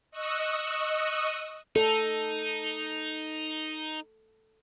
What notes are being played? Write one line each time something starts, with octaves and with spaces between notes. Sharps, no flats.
D#5 C#6 D#6 E6 F#6
D#4 A4